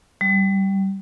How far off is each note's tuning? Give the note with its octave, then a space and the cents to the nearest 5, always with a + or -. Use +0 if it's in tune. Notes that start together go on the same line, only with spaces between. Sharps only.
G3 -15